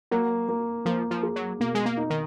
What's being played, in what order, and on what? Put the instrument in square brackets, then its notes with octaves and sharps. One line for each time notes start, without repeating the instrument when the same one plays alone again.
[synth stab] F#3 [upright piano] A#3
[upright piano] A#3
[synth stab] F3 [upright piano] A#3
[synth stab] F3
[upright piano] G#4
[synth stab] F#3
[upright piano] B2 [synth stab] A#3
[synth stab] G#3
A#3
[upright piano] D#4
[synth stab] D#3